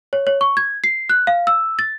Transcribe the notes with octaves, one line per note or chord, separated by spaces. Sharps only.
C#5
C#5
C#6
G#6
C7
F#6
F5
E6
A6